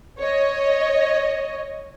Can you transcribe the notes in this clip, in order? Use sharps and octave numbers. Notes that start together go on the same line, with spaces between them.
C#5 D#5